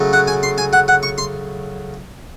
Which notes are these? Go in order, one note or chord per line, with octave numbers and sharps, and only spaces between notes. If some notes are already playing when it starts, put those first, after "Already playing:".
Already playing: C#3 F#3 A3
F#5
G#5
C6
G#5
F#5
F#5
C#6
C6